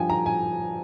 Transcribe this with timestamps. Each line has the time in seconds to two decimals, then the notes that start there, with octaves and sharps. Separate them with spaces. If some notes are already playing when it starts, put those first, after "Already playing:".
Already playing: G2 F3 G5 G#5
0.10 A#5
0.26 G#5